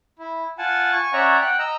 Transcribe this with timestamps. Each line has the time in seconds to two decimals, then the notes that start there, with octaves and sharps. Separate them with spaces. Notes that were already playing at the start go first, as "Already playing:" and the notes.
0.19 E4
0.58 F4 F#5 G#5 A5
0.93 G#5 C#6
1.13 C#4 C#5 D5 E5 F#5 A#5
1.42 F#5 G5 F#6
1.59 D#5 A#5 E6